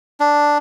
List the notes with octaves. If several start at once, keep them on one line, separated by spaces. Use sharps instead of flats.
D4